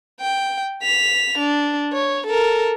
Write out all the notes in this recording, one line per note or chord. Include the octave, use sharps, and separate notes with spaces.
G5
B6 F7
D4
C#5
A4 A#4